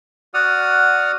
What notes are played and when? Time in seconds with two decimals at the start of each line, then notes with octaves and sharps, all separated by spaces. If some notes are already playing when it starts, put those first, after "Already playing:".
0.34 F#4 D5 F#5 D#6 F6